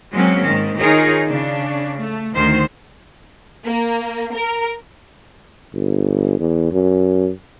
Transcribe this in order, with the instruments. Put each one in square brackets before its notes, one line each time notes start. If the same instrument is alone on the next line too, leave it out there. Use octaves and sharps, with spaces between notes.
[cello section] F#3 G#3 A#3 C4 C#4
G#2 D#3
D#3 D#4 F4 G#4 A#4 C#5
C#3 D4
A3
D2 D#3 C5
[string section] A#3
A#4
[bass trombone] G1
E2
F#2